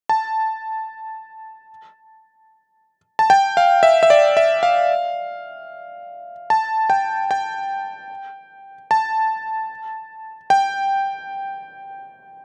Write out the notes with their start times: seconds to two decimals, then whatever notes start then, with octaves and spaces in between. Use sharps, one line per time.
0.09 A5
3.19 A5
3.30 G5
3.57 F5
3.83 E5
4.03 E5
4.10 D5
4.37 E5
4.63 F5
6.50 A5
6.90 G5
7.31 G5
8.91 A5
10.50 G5